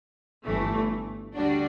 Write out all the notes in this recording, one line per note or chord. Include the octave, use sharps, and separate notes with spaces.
G1 G2 E3 A3
D2 D3 G3 D4 F#4